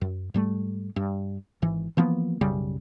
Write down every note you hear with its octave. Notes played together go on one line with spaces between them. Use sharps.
F#2
G#2 G3 A3
G2
G#1 G#2 E3
E3 F3 A#3 B3
B1 F#2 C#3 G3